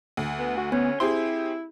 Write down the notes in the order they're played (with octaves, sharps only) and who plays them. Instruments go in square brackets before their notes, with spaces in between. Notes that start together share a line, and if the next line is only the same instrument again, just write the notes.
[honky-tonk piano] D2
[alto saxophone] B3
F#4
[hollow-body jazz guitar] B3 [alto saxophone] C#4
[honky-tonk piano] C4 G4 G#4 [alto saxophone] E4 [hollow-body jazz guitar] C6